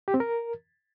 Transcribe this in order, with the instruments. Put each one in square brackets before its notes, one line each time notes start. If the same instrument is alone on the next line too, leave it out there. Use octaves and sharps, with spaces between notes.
[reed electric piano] G4
C4
A#4